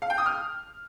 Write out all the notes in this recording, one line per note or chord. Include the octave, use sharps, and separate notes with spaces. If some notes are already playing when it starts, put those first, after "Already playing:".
F5
G5
D#6
F6